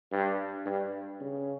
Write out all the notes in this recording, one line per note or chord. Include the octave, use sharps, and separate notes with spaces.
G2
G2
C#3